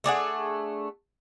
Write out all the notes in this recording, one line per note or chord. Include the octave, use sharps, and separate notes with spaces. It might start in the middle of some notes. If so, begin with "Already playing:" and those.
A3 D4 G#4 F#5